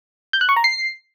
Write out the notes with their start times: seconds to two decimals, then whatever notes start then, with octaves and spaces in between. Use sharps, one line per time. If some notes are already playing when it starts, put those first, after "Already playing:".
0.33 G6
0.41 F#6
0.49 C#6
0.56 A#5
0.64 C7